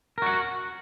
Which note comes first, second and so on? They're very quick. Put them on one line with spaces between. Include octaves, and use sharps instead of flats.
A#4 F#4 F#5